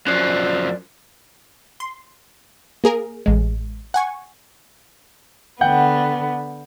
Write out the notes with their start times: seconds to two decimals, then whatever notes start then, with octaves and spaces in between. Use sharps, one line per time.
0.07 F#2 F3 D5 F#6 C7
1.80 C6
2.84 A#3 G#4 A#4
3.26 A1 G#3
3.94 F#5 G#5 C#6
5.61 D3 B3 F#5 G5 G6